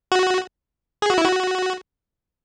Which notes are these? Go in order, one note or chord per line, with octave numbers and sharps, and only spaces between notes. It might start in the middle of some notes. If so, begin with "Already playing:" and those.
F#4
G#4
F#4
E4
F#4